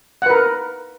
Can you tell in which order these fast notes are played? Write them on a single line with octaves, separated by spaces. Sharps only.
F#5 B4 A#4